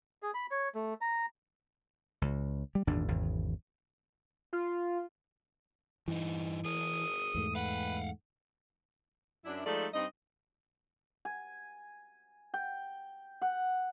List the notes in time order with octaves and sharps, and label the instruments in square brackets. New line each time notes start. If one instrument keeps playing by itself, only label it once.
[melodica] G#4
B5
C#5
A3
A#5
[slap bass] C#2
G3
G#1 E2 A#2 D4
G#1 E2 C#3
[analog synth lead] F4
[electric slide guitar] G2 D#4 [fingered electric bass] E3
[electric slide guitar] G#4 A#4 C#5 [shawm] D#6
[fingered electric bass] E2 G#2 A3
[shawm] B4 [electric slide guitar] F5 F#5
[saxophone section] F#2 D4 E4
F3 G#3 A3 D#4 A4 D5
G2 C4 D#4 D#5
[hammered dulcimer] G#5
G5
F#5